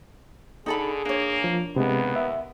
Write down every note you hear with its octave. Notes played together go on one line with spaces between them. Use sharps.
D3 D#4 G#4 A4 B5
A#3 D4 C#5
F3
D#2 C3 G#3 B3
E5